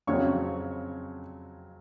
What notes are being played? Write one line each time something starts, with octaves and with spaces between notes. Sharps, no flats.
F2 C#3 F#3 C4 C#5 C#6